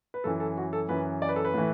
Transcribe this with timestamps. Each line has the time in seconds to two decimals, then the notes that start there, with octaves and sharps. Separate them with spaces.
0.14 B4
0.24 F#2 E3 A4
0.40 A4
0.57 F#4
0.73 A4
0.89 F#2 E3 B4
1.22 D5
1.29 B4
1.36 A4
1.45 B4
1.54 A2 E3